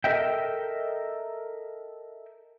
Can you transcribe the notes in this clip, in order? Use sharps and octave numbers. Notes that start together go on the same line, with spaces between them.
A4 A#4 D#5 E5 G5